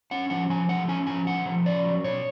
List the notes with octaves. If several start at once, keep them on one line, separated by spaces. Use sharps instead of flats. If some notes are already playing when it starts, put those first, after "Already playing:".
C#4 F#5
F3 F#5
F3 G#5
A3 F#5
C#4 G#5
F3 G#5
A3 F#5
F3
C#4 D5
F#3
B2 C#5